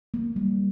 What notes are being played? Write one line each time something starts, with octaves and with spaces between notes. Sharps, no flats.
A#3
G3